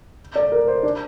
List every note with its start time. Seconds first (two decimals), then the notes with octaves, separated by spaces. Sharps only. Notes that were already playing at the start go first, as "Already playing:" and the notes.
0.36 D5
0.52 A#4
0.68 C5
0.83 D4